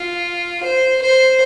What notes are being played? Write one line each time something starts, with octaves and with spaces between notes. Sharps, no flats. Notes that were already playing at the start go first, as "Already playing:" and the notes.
Already playing: F4
C5
C5